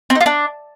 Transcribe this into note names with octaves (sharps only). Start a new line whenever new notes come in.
C4
D#4
F4
D4